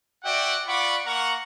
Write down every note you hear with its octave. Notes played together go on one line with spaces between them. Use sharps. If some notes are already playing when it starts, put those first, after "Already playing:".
F#4 D5 E5 F#5 G5
F4 D5 F#5 B5 C#6 D6
A#3 A#4 F#5 A#5 C#6